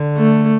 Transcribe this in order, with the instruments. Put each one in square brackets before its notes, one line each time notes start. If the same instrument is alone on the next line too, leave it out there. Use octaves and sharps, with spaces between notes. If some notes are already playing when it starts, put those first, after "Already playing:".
Already playing: [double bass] D3
[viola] A3